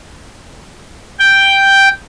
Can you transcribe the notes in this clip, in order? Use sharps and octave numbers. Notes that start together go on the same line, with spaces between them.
G5